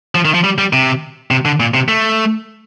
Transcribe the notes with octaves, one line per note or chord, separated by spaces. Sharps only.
F3
D#3
F3
G3
G3
C3
C3
D3
A#2
C3
A3